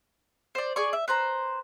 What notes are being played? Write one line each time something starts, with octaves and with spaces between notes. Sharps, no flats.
C5 D5
G#4 D5 C#6
E5
B4 C5 A#5